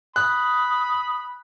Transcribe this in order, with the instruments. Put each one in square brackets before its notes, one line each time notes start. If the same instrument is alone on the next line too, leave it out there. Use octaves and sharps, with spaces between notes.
[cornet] B5 [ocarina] D#6 [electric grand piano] F#6